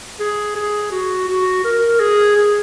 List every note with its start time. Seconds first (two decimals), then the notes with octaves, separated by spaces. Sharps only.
0.20 G#4
0.56 G#4
0.92 F#4
1.28 F#4
1.64 A#4
2.00 G#4
2.36 G#4